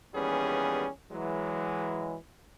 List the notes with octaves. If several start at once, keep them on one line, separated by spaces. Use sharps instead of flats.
D#2 E3 G3 B3 C#4 G#4
E3 F#3 G#3